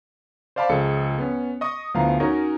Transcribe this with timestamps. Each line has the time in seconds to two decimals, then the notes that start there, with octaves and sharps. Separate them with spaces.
0.56 C5 D5 F5 A5 B5 D6
0.69 C#2 F3 G#4 A4 C#7
1.18 B3 C#4
1.61 D#5 C#6 D#6
1.94 D2 F3 B3 E4 F5 A#5
2.20 C#4 D#4 F#4 A#4 C#5 D#5